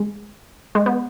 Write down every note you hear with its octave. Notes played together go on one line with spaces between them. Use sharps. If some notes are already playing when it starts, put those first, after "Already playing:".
Already playing: G#3
G#3
B3